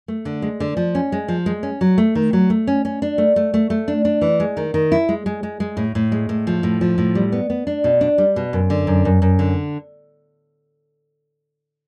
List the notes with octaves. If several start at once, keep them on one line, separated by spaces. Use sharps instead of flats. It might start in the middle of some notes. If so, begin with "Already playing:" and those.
A3
D3
G#3
D3
F3
C#4
G#3
F3
G#3
C#4
F#3
A3
D#3
F#3
A3
C#4
C#4
D4
A3
A3
A3
A3
D4
D4
E3
G#3
D#3
D#3
E4
G#3
G#3
G#3
G#3
A2
A2
G#3
A2
F3
A2
F3
A2
G3
B3
B3
D4
B2
D4
G3
B2
F#2
D3
F#2
F#2
F#2
D3